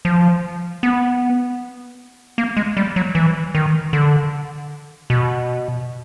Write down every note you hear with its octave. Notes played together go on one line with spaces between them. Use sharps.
F3
B3
A#3
G#3
G3
F#3
E3
D#3
D3
B2